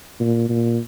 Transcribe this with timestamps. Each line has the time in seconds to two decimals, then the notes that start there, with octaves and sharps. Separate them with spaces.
0.20 A#2
0.49 A#2